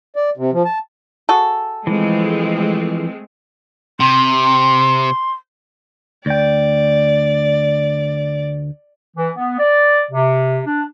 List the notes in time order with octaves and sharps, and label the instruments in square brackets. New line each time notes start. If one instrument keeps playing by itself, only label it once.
[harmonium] D5
C3
F3
A5
[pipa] F#4 G#4 A4
[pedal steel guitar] E3 F3 [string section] G#3 A3 C4
[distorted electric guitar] C3 [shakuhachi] C6
[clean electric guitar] D2 G5 [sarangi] D5
[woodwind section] E3
B3
D5
C3
D4